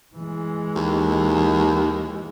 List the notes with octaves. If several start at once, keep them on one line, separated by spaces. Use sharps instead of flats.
E3 G#3
D#2